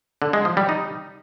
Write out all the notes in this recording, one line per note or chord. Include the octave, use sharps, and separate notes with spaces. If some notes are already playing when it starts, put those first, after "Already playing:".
D3
G#3
F3
G3
D#4